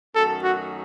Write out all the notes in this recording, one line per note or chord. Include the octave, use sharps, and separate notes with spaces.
F#2 D#3 F#3 A3 C#4 A4
F#4